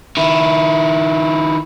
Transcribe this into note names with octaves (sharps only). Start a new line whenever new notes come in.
D#3 E4